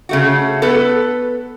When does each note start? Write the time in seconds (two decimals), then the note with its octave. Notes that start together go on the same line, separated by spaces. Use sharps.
0.09 C#3 A3 F#4
0.62 B3 A4 B4